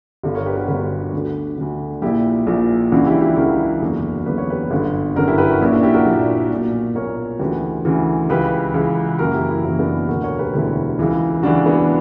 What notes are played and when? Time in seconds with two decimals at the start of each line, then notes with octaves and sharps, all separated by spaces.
0.23 G1 G2 D3
0.35 A#4 C#5
0.46 G4 B4
0.56 F#4 A#4
0.67 G1 G2 D3 G4 B4
1.12 D2 D3
1.58 D2 D3
2.02 A#1 A#2 E4 G4
2.47 A#1 A#2
2.92 C#2 C#3 E3 D4 F#4
3.06 E4 G4
3.21 E4 G4
3.36 C#2 C#3 E3 F#4 A#4
3.82 F#1 E2 D3
4.26 F#1 E2 D3 B4
4.38 C#5
4.50 G4 B4
4.71 G1 F#2 D3
5.16 G1 F#2 D3 F#4 A#4
5.28 E4 G4
5.38 G4 B4
5.50 F#4 A#4
5.61 A#1 A#2 C#4 E4
5.72 D4 F#4
5.83 E4 G4
5.94 F#4 A#4
6.06 A#1 A#2
6.50 B1 A#2
6.95 B1 A#2 A#4 C#5
7.39 D2 C#3 E3 G4 B4
7.85 D2 C#3 E3
8.29 C#2 C#3 E3 G4 B4
8.74 C#2 C#3 E3
9.19 F#1 F#2 E3 F#4 A#4
9.34 E4 G4
9.49 E4 G4
9.64 F#1 F#2 E3 C#4 E4
9.79 B3 D4
10.08 E1 D2 D3 F#4 A#4
10.24 A#4 C#5
10.39 G4 B4
10.53 E1 D2 D3 E4 G4
10.99 C#2 C#3 E3
11.43 C#2 C#3 E3 D4 F#4
11.66 B3 D4